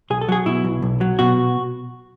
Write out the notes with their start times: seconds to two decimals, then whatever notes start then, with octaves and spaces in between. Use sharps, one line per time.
0.10 B1 G#4
0.21 A4
0.29 F#3 G#4
0.46 B2 E4
0.64 B1
0.82 B1
1.01 F#3
1.19 B2 F#4